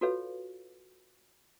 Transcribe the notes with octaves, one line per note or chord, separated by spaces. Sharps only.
F4 F#4 A4 B4 C#5 F5